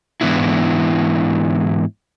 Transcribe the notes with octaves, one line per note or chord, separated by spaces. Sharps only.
G#2 E3 B3 D4 E4